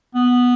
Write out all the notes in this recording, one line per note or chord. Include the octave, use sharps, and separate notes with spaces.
B3